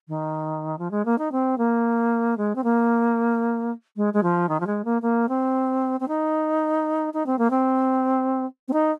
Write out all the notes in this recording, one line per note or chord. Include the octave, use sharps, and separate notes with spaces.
D#3
F3
G#3
A#3
D#4
C4
A#3
G#3
C4
A#3
G#3
G#3
F3
D#3
F3
G#3
A#3
A#3
C4
C4
D#4
D#4
C4
A#3
C4
C4
D#4